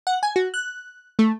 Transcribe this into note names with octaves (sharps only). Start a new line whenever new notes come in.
F#5
G#5
F#4
F#6
A3